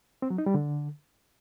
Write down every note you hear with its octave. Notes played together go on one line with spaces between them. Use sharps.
C4
F#3
D#4
G3
D3